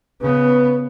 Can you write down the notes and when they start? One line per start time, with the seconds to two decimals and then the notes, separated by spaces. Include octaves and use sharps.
0.21 C#3 B3 B4